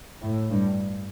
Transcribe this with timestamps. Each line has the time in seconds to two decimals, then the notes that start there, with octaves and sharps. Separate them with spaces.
0.23 A2
0.50 G2